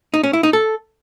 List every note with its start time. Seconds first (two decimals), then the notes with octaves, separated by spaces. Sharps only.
0.14 D#4
0.23 C#4
0.33 E4
0.43 D#4
0.53 A4